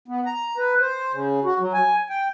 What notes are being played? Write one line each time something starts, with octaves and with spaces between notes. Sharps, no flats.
B3
A#5
B4
C5
C#3
F#4
F#3
G#5
G5